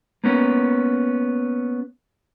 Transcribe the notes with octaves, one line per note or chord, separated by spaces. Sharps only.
A#3 B3 C#4